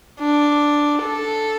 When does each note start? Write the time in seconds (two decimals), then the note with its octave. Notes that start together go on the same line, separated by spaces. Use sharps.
0.20 D4
1.03 A4